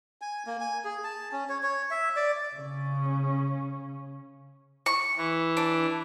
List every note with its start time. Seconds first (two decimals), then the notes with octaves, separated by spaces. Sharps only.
0.21 G#5
0.47 A#3
0.60 G#5
0.85 G#4
1.04 A5
1.32 C#4
1.49 C#5
1.63 C#5
1.91 E5
2.16 D5
2.56 C#3 C#4
4.86 C#6
5.17 E3
5.57 D4